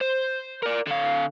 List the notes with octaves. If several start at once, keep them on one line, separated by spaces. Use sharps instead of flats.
C5
A#4 D5
D3 F5